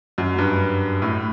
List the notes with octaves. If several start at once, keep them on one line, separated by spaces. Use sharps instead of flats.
F#2
G2
A2